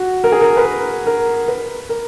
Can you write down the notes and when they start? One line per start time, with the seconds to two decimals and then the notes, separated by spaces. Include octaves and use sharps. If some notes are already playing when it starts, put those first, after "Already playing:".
Already playing: F#4
0.24 A#4
0.32 G#4
0.41 A#4
0.57 B4
0.65 A#4
1.07 A#4
1.48 B4
1.89 A#4